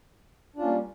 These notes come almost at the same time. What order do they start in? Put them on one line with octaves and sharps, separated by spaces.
D4 F4 C#4 A#3 G3